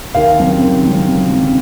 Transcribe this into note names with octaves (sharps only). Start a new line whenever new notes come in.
D#2 F5
C#3 F#3 C4
D#2
C#3 F#3 C4
D#2
C#3 F#3 C4